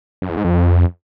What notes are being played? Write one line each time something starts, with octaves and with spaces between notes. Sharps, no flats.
F#2
E2
G#2
F2